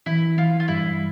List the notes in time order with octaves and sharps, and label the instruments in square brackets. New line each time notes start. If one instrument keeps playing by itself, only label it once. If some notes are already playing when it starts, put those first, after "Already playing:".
[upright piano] E3 [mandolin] E4
[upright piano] E3 [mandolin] F4
[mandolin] F4
[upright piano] G2 [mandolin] E4